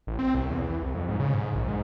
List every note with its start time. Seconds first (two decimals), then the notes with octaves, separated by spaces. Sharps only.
0.07 A1
0.19 C4
0.35 C2
0.50 E2
0.69 E3
0.82 C2
0.95 F2
1.09 G#2
1.20 C#3
1.34 G#2
1.55 A#1
1.68 G#2